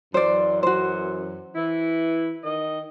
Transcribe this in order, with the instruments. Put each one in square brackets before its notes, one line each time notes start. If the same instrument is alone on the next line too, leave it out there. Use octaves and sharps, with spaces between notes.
[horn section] F#2 E3 [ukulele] C5 D5
[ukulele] F#4 C5
[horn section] E3 E4
D#3 D#5